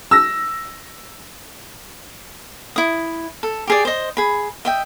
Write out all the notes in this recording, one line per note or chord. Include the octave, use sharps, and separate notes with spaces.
E6 A#6
E4 D#6
A4
G4 G#4 D5
C5 D#5
G#4 B5
D#5 E5 G5